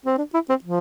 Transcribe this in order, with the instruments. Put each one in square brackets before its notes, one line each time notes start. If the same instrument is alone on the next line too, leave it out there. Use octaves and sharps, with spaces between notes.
[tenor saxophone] C4
D4
E4
C4
F3